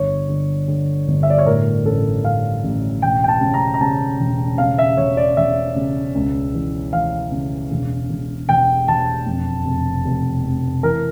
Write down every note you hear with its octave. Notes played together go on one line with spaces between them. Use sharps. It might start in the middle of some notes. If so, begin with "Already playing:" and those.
Already playing: G1 C#5
D3
D3
G1
E5
D5
C#5
A2 A#4
A1 A4
A1 F5
A1
E1 G5
G5
A5
C#3
A#5
A#5
C#3 A5
E1
C#3 F5
E5
E1 C#5
D5
E1 E5
C#3
C#2
E3
E3 F5
C#3
E1
E1
E1 G5
E1 A5
F2
F1
F1
F2
E3 A#4